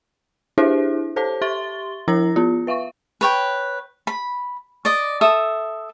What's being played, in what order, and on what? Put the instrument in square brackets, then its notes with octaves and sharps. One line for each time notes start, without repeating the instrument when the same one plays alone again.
[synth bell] D4 E4 G4 G#4 C5 E5
G4 A4 C5 C#5 A5 D6
G4 E5 C6 C#6 A6 G7
F3 E4 A#4 A#5 E6 A#6
B3 F4
B4 E5 F5 C#6
[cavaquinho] B4 C#5 G5
B5
D5 D#5
A4 E5 D#6